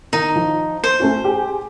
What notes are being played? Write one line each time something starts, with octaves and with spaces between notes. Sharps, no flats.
D#3 D#4
F3
C5
A3 C#4 F#4
G4 G#4